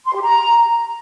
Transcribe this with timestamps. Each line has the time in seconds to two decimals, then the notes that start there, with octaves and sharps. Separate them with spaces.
0.06 C6
0.14 G4
0.22 A#5